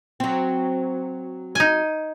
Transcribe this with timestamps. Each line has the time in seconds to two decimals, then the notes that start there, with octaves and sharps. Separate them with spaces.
0.20 F#3 C4
1.55 D#4 G#5